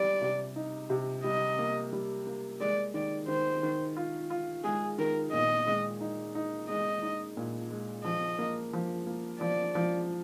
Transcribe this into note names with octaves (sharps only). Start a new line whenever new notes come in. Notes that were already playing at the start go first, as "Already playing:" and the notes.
Already playing: G3 D5
C3
D#4
C3
G3 D#5
A#3
G3
A#3
G#3 D5
D#3 D5
D#3 C5
D#3
F4
F4
G#3 G#4
D#3 A#4
A#2 D#5
G#3
D#4
D#4
G#3 D#5
D#4
A#2
G#3
F3 D#5
A#3
F3
A#3
F3 D5
F3